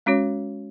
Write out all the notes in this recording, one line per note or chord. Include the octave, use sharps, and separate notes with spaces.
G#3 C#4 F#4 C#5